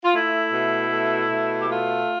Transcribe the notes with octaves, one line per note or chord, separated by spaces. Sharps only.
F4
A3 E4
B2
A3
B2
G4
A3 F4